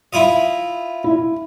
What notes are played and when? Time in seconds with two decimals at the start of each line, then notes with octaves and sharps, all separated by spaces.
0.13 E4 F4 D#5
1.04 E4